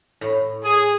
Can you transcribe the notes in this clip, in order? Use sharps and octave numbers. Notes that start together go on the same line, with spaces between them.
A2
G#4